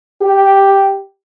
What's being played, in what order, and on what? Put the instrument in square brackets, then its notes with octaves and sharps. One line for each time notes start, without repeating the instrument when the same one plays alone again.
[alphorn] G4